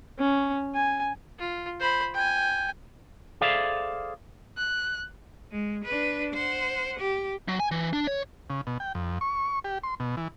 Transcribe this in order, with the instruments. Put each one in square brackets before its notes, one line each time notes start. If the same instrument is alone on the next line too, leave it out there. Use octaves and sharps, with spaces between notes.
[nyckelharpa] C#4
G#5
F4
C5 B5
G5 G#5
[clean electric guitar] G#4 A4 C5 D5 E5 F5
[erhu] F#6
[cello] G#3
D4 B4
C5 F#5
G4
[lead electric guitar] F#3
G#5
E3
D4
C#5
[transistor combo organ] C#3
B2
G5
F2
C#6
G4
C6
B2
E3